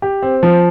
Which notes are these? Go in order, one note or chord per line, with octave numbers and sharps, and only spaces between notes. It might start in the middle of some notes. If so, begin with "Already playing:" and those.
G4
C4
F3